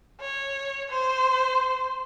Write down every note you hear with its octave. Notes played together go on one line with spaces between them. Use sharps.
C#5
C5